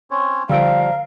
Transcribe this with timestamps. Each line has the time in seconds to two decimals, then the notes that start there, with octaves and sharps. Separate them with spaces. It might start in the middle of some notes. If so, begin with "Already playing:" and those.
0.11 C4 C#4 C#5
0.49 D3 F3 G3 A#4 F5 E6 D7